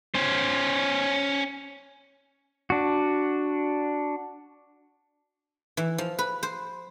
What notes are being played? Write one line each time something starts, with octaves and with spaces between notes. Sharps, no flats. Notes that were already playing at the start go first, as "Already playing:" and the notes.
C#4 C5
D4 F#4
E3
F3
B4
C5